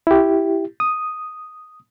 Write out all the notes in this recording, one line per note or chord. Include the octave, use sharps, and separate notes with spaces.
E4 G4
D#6